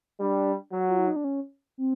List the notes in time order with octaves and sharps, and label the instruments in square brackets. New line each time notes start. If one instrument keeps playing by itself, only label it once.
[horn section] G3 [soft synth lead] D4
[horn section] F#3
[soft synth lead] F4
E4
D#4
D4
C#4
C4